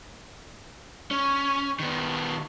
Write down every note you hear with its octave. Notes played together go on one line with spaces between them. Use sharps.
C#4
D#3 B3